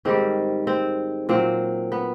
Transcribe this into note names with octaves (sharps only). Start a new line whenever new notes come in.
G#2 D#3 G3 C4
C4
A#2 F#3 C4
B3